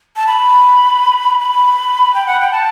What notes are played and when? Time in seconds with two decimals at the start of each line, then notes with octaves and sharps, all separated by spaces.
0.16 A5
0.27 B5
1.40 B5
2.14 G5
2.27 F#5
2.40 G5
2.52 A5